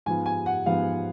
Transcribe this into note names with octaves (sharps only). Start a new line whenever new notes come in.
G#2 F3 B3 F4 G#5
G#5
F#5
G#2 F3 B3 F4 F5